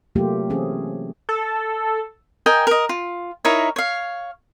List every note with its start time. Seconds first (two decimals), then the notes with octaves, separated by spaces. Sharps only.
0.15 C3 F#3 A3 A#3 F4 G4
0.50 E3 C4 C#4 G#4
1.29 A4
2.46 A#4 D#5 G5 G#5
2.67 A#4 D#5
2.89 F4
3.45 D#4 E4 A#4 C#5
3.76 C#5 F5